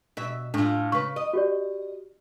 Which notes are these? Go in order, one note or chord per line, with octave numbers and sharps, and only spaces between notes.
B2 E5
A2 D4 F4
C#3 B4 C#6
D#5
F#4 G4 D5